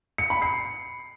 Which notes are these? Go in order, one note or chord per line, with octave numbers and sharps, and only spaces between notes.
C#7
B5
C7